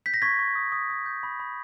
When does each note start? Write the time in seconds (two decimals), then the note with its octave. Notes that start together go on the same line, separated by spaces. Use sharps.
0.06 G6 B6
0.14 A#6
0.22 C#6 G#6 B6
0.39 C#6
0.55 D#6
0.72 D#6
0.90 D#6
1.06 G6
1.23 B5
1.40 B5